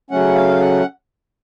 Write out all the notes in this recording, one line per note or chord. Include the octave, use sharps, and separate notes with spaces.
C#3 F#3 A3 C#4 F#5
F5
F#5